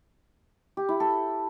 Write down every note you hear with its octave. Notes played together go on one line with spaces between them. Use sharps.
G4
E4
A4